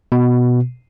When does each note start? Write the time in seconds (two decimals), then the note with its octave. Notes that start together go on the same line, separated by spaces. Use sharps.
0.12 B2